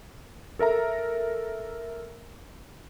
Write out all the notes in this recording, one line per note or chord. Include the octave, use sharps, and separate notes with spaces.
A4 A#4 E5 A#5